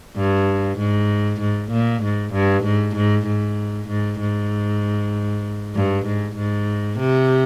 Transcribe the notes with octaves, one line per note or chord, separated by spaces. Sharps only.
G2
G#2
G#2
A#2
G#2
G2
G#2
G#2
G#2
G#2
G#2
G2
G#2
G#2
C3